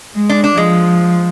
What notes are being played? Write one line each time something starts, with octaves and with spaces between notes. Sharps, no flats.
G#3
D4
D4
F3 G#3